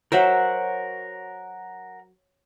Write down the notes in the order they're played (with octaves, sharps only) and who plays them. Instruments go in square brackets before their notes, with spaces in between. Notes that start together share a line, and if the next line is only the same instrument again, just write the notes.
[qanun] F#3 C5 E5 [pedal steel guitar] A#4 F#5